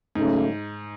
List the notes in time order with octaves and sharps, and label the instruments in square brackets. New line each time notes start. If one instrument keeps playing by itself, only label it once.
[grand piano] G#2 [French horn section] C#3 F#3 A3 C#4